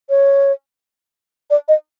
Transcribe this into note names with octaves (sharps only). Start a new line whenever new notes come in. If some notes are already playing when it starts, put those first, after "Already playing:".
C#5
D5
D#5